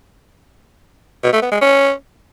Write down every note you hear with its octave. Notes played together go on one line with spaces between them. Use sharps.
B2
A3
B3
G#3
C#4